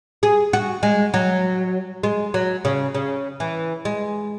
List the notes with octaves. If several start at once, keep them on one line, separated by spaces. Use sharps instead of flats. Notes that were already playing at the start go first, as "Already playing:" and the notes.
G#4
F#4
G#3
F#3
G#3
F#3
C#3
C#3
E3
G#3